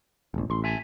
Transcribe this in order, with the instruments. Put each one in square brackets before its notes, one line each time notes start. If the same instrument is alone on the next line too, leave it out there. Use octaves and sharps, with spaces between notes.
[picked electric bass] E1 A1
[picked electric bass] A1 [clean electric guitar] C6
[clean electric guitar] E5 G#5 A5